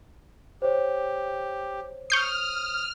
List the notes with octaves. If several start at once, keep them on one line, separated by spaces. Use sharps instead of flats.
G4 C5 C#5
C#6 D#6 F6 G6 C7